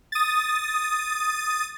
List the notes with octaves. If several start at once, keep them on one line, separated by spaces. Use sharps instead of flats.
D#6 A6